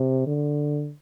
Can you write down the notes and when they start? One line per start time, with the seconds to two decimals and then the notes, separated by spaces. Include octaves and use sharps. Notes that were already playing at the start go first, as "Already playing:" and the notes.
Already playing: C3
0.27 D3